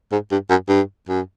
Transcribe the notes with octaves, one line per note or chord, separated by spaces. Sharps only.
G#2
G2
F#2
G2
F#2